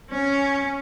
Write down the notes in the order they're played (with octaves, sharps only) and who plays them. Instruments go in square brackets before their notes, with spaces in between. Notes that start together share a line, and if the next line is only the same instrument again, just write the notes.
[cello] C#4